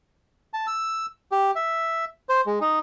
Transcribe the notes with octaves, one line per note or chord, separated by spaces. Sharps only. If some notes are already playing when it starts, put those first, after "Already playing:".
A5
E6
G4
E5
C5
G#3
D#4